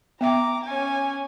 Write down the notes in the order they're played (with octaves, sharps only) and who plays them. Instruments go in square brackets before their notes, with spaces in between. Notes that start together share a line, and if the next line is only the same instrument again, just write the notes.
[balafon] B3 E5 G5 [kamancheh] A#5 D6
[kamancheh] C#4 G#5